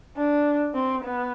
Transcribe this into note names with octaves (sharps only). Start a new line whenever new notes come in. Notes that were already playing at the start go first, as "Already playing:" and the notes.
D4
C4
B3